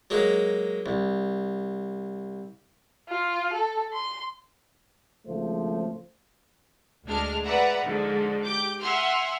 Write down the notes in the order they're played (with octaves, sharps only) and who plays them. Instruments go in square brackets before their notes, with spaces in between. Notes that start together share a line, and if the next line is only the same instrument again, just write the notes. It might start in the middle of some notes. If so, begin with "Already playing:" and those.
[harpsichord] F#3 G#3 A#3
C2
[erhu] F4
A4
C6
[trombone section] G#1 C#3 F3 A3 C5
[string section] D2 G#3 D4 F6
B4 D5 E5 F#5 A#5
G#2 D3 F3
G4 D6 G6
E5 F#5 G#5 C6 F6